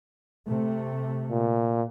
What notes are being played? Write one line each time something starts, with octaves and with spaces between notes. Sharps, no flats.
C3 A3
A#2